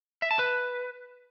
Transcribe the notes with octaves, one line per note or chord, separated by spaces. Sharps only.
E5
A5
B4